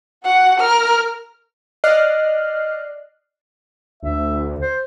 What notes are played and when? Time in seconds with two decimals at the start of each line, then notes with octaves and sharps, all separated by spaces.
0.24 F#4 F#5
0.59 A#4 F6
1.84 D5 D#5 F6 F#6 C7
4.03 D2 E5
4.60 C5